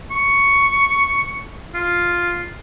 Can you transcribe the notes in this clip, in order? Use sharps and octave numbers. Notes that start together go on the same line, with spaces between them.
C#6
F4